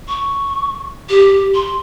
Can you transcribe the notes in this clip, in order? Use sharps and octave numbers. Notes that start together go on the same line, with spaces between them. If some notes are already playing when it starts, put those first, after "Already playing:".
C#6
G4
C6